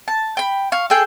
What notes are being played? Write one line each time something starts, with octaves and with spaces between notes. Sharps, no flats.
A5
G5 B5
F5 C#6
G#4 A4 G5